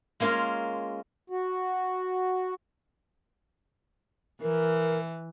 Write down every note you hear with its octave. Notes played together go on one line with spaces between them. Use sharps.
G#3 A#3 C#4 F4 A#4
F#4
E3 A#4